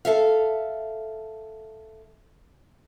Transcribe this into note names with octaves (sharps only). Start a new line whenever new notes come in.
A4 E5 F5